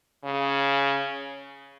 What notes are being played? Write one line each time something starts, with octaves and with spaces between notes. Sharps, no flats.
C#3